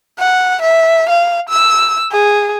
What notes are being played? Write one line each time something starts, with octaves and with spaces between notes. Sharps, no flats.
F#5
E5
F5
E6
G#4